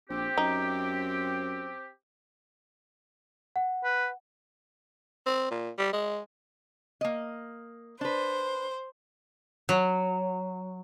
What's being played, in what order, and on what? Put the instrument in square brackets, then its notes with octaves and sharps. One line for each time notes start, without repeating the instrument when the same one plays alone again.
[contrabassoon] A#1 [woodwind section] C4 G4
[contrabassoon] F#2 [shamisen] D#4
[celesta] F#5
[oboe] B4
[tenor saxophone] C4
A#2
G3
G#3
[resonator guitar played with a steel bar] A#3 D#5
[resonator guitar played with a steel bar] D4 B4 [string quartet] C5
[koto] F#3